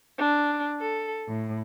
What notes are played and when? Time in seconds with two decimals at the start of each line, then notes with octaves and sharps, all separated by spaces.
0.18 D4
0.82 A4
1.28 A2